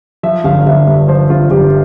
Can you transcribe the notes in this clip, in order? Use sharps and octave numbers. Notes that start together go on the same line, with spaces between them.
F3 E5
G1 F5
F5
G1 E5
G2 E5
F3 C5
G1 F4
G1 G4